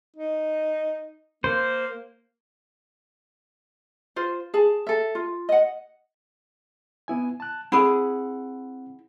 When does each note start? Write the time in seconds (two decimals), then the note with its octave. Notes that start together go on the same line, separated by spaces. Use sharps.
0.16 D#4
1.44 A#3 C5
4.16 F4 C5
4.54 G#4 A5
4.87 A4 E5
5.15 F4
5.49 D#5 F#5
7.08 B3 E4 G#5
7.40 A5 F#6
7.72 C4 E4 G#4 F#5